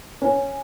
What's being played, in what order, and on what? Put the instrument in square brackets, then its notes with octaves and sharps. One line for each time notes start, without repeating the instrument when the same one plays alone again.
[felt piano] C#4